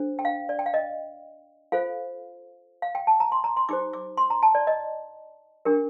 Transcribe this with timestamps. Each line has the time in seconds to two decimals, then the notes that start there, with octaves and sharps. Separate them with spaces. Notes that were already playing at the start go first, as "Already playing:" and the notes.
Already playing: D4 A4 C5
0.19 G5
0.25 F5
0.49 D5
0.59 G5
0.66 F5
0.74 D#5
1.72 F4 A4 C5 F5
2.82 F5
2.95 G5
3.07 A5
3.20 A#5
3.32 C6
3.44 A#5
3.57 C6
3.69 D#4 G4 C5 D6
3.93 D6
4.18 C6
4.30 A#5
4.43 A5
4.55 D5
4.67 D#5
5.65 D4 G4 A#4